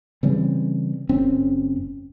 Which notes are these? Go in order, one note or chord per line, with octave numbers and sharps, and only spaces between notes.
C#3 E3 G3 C4
F#1 C4 C#4